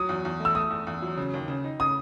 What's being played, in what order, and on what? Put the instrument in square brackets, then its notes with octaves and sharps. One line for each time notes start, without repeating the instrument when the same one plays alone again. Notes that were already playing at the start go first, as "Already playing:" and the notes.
Already playing: [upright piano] F#3 [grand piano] D#6
[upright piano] E2
E2
A3
[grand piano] E6
[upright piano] A3 [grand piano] D#6
[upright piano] E2
E2
F#3
C#3
D#2
C#3
D#4
[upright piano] C#3 [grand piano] D#6